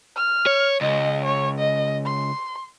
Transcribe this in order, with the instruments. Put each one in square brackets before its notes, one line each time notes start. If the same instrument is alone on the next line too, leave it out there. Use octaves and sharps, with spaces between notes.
[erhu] F6
[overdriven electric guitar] C#5
[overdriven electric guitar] C#2 [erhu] D#5
[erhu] C#5
D#5
C6